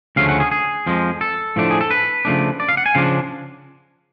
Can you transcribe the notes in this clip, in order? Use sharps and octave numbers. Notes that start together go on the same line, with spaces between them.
D2 C#3 F3 A3 C#4 F5
F#5
G#4
G#4
F2 F3 G#3
A4
A2 F3 A3 D4
G#4
A4
B4
C#3 F3 A3 D4
D5
F5
F#5
G#5
C#3 F3 D4 F5